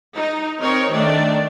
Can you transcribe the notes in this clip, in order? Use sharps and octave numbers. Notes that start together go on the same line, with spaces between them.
D#4
C4 D#4 A#4 C#5
D#3 A3 D4 D5